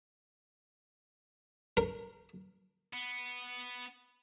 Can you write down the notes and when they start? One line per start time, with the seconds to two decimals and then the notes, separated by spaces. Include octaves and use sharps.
1.77 A#4
2.93 B3